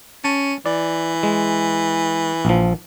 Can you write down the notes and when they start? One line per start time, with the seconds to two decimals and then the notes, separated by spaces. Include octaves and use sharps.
0.24 C#4 A5
0.66 E3 D5
1.23 G#3
2.45 A#1 F3